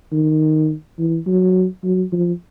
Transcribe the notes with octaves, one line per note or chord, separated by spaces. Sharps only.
D#3
E3
F#3
F#3
F3